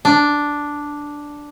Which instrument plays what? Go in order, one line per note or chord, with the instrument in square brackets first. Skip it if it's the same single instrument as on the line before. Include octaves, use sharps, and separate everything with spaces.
[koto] D4